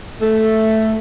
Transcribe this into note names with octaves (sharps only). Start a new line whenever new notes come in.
A3